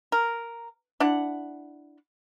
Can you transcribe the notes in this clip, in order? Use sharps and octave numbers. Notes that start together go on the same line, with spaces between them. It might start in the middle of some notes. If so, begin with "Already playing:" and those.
A#4
D4 E4 F#5